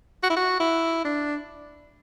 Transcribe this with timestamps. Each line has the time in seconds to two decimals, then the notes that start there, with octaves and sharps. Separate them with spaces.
0.23 F#4
0.30 E4
0.37 F#4
0.60 E4
1.05 D4